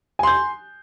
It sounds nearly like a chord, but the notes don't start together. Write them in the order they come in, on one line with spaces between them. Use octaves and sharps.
G#5 C6 G6